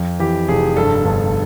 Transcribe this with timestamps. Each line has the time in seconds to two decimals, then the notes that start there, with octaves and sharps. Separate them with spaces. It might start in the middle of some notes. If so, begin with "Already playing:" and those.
Already playing: F2
0.20 E3 G4
0.48 F1 G#4
0.77 G2 A4
1.05 G1